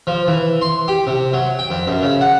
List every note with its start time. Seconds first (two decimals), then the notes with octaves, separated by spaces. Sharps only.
0.07 F3
0.28 E3
0.62 C6
0.88 G4
1.07 C3
1.33 F#3
1.59 G5
1.70 F2
1.87 F#2
2.03 C#3
2.21 F#5